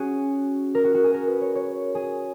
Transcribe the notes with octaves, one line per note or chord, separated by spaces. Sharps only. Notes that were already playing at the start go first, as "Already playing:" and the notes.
Already playing: C#4 F#4 G#4
A#4
F#4
F#4
G#4
A#4
B4
C#5
C#5
G#4